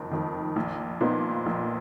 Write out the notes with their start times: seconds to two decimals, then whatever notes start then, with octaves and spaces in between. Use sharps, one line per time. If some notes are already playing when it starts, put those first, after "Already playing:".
Already playing: F#1 F2 D#3
0.11 F2 D#3
0.56 A#1
1.01 A#2 F3 B3 D#4
1.46 A#1